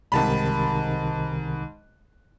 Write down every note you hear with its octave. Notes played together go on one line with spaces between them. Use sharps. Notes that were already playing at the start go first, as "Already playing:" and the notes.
C2 G#2 C3 D#3 A5 B5